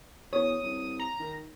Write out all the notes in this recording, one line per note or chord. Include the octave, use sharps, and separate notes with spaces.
E2 C#5 D#6
C2
A#5
D#3